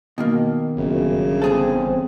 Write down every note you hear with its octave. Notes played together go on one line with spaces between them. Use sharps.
B2 D#3 A#3
G1 F#2 C#3
E2 C4 G#4 A4